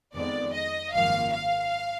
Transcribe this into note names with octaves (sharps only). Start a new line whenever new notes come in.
F2 D#3 G#3 B3 D5
D#5
G#1 F#2 F3 A#3 F5
F5